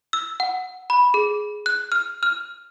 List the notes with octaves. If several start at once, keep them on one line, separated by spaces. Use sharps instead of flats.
E6
F#5
B5
G#4
F#6
F6
F6